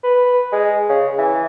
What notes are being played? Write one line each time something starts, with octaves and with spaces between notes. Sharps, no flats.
B4
G#3
C#3
E3